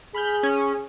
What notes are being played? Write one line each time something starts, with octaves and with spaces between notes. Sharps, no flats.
G#4 B5 F6 G6
C#4